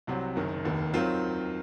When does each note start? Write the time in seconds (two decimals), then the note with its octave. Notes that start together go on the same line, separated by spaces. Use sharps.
0.07 C2 C3 F#3 C4 F#4
0.36 F#1 F#2 D#3
0.64 F1 D#2 D#3
0.94 D#3 F#3 C4 F4